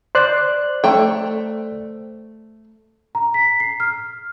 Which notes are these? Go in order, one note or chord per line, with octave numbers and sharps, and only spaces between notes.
C5 D5 F#6
A3 G5
A#5
B6
C7
F6